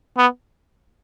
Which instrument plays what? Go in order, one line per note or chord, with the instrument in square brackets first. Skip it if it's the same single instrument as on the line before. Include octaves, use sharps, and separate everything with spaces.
[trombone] B3